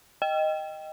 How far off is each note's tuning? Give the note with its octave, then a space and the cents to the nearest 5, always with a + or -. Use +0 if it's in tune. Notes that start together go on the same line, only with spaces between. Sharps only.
D#5 +0 G5 +0